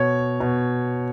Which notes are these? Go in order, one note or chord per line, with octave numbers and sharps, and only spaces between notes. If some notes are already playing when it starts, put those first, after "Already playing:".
Already playing: B2 C#5
B2